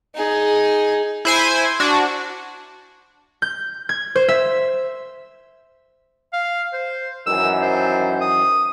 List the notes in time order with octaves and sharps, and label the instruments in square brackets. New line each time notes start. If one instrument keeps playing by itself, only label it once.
[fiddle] D#4 G#4
[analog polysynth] E4 C5 G#5
D4 F#4
[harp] G6
G#6
C5
E5
[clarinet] F5
C5
[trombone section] F#2 D#3 E3 [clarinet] E6
[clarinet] C5
D#6